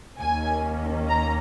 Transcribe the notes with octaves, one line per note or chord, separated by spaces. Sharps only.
D#2 D#3 A#3 C#4 G#5
A#5